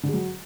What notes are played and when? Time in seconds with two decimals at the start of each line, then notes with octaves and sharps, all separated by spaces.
0.03 D3
0.08 G#4
0.14 F#3